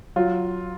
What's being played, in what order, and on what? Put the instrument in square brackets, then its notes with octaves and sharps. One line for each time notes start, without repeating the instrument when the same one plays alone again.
[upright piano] F#3 F4